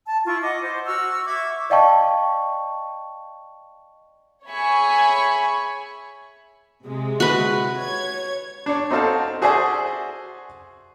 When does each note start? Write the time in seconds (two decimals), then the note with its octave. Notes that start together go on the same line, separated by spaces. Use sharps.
0.05 A5
0.25 E4 F4 C#6
0.42 D#5 F#5 D6
0.60 C5
0.86 F#4 C#6 E6 F6
1.25 E5 C#6 D6 G#6
1.70 D5 D#5 F5 G5 A5 C#6
4.46 G#4 C#5 E5 G#5 B5 C#6
6.85 C3 G#3
7.20 F#4 B4
7.80 C#5 G#6
8.66 D4 C#5
8.91 C4 D#4 F#4 A4 F5 A5
9.42 F#4 G#4 C5 D5 E5 G#5